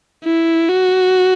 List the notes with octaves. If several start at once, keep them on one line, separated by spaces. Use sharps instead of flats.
E4
F#4